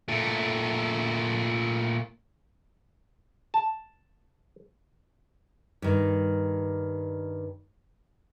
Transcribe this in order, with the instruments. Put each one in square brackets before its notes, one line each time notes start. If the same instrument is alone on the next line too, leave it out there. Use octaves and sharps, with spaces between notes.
[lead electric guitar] A#2 A3
[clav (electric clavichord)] A5
[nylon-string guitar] G2 D#3